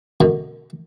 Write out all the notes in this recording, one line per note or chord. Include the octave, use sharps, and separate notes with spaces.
F#2 B2 D3